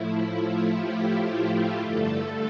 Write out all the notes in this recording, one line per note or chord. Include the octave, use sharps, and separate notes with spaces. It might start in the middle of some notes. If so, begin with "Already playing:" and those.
Already playing: A2 F3 A3 E4
F4
G4
G2 D3 A3 A4